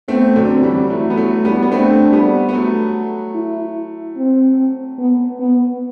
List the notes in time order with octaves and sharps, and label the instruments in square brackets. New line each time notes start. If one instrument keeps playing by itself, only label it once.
[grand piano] A3 C4 [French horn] B3
[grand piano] D3 F#3
[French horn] C4
[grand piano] E3 G3
[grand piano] F#3 A3 [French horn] E4
[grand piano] B3
F#3 A3
G3 B3
B3
[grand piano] A3 C4 [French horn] D4
[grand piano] G3 B3
B3
F#3 A3
[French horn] E4
C4
B3
B3